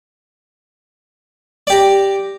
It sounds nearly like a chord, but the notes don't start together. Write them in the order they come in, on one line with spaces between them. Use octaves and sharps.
D5 G4 A#5